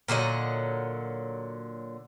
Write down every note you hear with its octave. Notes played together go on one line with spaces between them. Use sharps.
A#2 D3 F#3 D#5